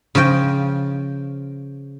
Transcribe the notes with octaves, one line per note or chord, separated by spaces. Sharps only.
C#3 F3 D#5 G5